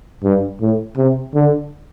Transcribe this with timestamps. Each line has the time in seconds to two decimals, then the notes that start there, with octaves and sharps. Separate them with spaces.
0.23 G2
0.61 A2
0.97 C3
1.35 D3